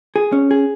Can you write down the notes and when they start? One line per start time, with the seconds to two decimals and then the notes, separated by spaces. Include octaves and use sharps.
0.16 G#4
0.32 C#4
0.51 G#4